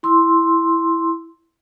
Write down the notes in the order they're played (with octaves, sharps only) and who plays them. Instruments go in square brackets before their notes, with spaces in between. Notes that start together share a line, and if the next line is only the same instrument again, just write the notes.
[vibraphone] E4 C6 E6